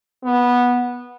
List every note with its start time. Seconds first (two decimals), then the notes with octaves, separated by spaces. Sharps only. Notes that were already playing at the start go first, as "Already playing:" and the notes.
0.24 B3